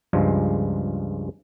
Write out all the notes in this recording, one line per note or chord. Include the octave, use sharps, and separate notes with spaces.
C#2 G2 F3 G#3 G#5